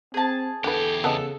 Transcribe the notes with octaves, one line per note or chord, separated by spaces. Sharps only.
C4 G#4 A5
E2 D3 G4 A4 B4
C#3 B3 A4 D#5